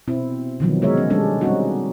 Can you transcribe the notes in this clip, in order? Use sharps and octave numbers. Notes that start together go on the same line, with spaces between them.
B2 C4 E4
B2 D3 D#3 F3 F#3 B3
C3 G#3 A#4 C#5 E5
C#4
G3 G#3 C#4 D4 A4
G3 A#3 C4 C#4 D#4 F#4